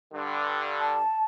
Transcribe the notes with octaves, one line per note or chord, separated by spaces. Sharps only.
G2 D3
A5